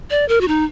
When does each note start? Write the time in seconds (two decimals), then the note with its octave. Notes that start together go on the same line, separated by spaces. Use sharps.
0.10 D5
0.29 A#4
0.41 F#4
0.48 D#4